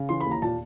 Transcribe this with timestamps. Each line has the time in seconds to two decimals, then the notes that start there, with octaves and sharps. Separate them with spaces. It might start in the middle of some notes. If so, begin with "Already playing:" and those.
Already playing: C#3
0.09 E3 C6
0.20 B5
0.26 D#2
0.31 A#5
0.42 A#2 A5